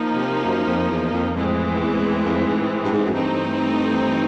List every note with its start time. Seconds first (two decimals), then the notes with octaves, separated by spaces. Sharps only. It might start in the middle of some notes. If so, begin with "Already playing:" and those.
Already playing: F3 A#3 D#4
0.15 C3
0.45 F#2
0.67 F2
0.90 E2
1.13 F2
1.34 F2 A2 E3 G#3 C4
1.80 E2
2.25 F2
2.47 G#2
2.84 G2
2.92 G#2
3.05 F#2
3.14 G2 E3 A3 C4 D#4